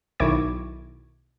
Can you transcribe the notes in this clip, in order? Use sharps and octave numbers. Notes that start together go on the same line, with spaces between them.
B1 D#3 E4 C#6 D6 G#6